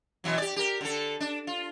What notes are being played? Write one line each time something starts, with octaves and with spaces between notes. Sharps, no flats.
B2 E3 F#3
G4 D5
G4 A#4
D3 A4
D4
F4